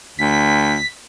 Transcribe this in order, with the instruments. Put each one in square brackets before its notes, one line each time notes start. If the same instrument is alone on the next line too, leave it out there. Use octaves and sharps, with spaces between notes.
[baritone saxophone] D2 [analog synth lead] B6